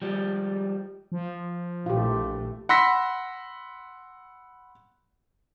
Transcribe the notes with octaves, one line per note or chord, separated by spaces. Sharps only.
F3 G3 G#3
F3
A#1 E3 A3 F4 G4
F#5 B5 C6 E6 A#6 B6